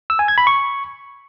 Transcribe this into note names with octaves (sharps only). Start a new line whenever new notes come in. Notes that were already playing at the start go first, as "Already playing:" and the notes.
E6
G#5
G#6
B5
C#6